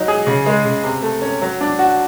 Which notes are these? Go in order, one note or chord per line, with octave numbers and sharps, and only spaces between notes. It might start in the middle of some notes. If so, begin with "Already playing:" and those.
Already playing: F#3 D#4
G#4
C#3
G#3
C#3
C3
A3
C#4
F#3
D4
F#4